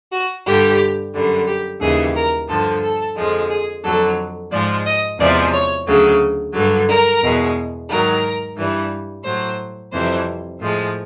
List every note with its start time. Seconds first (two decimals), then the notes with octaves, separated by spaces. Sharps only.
0.11 F#4
0.46 G2 D3 G3 G4
1.13 F#2 D3 G3
1.47 G4
1.81 D#2 C#3 E3 G3 G#4
2.15 A#4
2.48 G2 D3 F3 A4
2.82 A4
3.16 F2 D3 F3 G#3
3.50 G#4
3.83 F2 D3 F#3 A4
4.51 G#2 F3 G#3 D5
4.85 D#5
5.18 E2 C3 F3 G#3 D5
5.53 C#5
5.86 D2 C#3 F#3
6.53 G2 D3 F#3
6.88 A#4
7.22 E2 B2 G#3
7.89 G#2 D#3 F#3 A#4
8.57 G2 E3 G3
9.24 A2 F#3 C5
9.92 F2 C3 E3 G3 C5
10.59 A2 F3 G#3